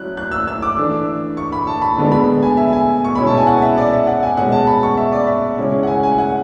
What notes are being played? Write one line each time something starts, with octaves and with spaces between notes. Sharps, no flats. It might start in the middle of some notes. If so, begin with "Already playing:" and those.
Already playing: F#3 C#4 E4 F#6
F#6
E6
E6
D6
E3 A3 D4
C#6
B5
A5
B5
D3 G#3 B3 D4
B5
G#5
E5
G#5
C#6
B2 G#3 C#4 E4 B5
A5
G#5
F#5
E5
D5
E5
F#5
G#5
B2 G#3 C#4 F#5
A5
B5
C#6
E5
D5
E5
C#3 G#3 C#4 E4
F#5
G#5
G#5
F#5